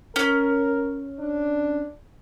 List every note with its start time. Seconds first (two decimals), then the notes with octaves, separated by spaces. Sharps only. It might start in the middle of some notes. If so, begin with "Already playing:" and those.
0.16 C#4 A#4
1.19 D4